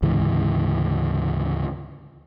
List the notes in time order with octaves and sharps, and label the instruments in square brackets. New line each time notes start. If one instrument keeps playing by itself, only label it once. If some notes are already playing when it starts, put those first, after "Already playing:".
[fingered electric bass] D2 G#2 C#3 E3